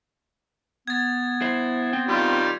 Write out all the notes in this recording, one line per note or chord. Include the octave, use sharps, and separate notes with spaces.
B3 G#6 A6
E4 C5
C4 G5
D#3 G3 F4